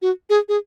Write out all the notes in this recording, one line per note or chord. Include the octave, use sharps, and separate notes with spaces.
F#4
G#4
G#4